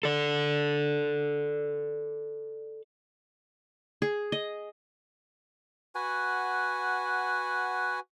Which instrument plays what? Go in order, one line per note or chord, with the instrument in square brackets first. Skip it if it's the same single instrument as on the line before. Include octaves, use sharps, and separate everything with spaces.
[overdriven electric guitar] A4 D5
[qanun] G#4
D#5
[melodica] F#4 B4 F#5 G#5